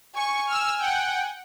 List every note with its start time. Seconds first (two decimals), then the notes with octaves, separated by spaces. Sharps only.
0.15 G#5 C#6
0.47 E6 F6
0.79 F#5 G5